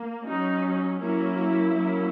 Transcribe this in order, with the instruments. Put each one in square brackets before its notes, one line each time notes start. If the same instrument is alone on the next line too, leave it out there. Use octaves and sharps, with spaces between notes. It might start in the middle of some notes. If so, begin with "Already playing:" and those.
Already playing: [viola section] A#3
F#3 C#4 D#4
F#3 A#3 C#4 E4
F#3 A#3 C#4